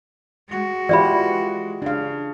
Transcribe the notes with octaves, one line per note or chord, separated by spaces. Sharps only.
G#3 F#4
E3 F4 G4 D5 E5 B5
C#3 D4 F5